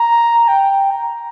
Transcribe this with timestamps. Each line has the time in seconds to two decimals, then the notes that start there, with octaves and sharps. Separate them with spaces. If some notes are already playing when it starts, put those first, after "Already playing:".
Already playing: A#5
0.48 G5
0.91 A#5